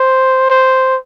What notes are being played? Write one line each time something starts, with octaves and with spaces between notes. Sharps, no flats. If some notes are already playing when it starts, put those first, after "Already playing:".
Already playing: C5
C5